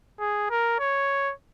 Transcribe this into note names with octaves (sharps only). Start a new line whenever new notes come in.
G#4
A#4
C#5